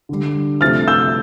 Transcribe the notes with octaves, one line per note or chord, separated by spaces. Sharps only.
D3 G3
C3 F3 A3 F6 A6
E6 G6